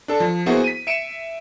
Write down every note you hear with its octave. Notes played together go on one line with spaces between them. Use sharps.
D4 A4
F3
A#3 B3 E4 F#4 G#4 C5
B6 D#7
E5 C#7 D7 E7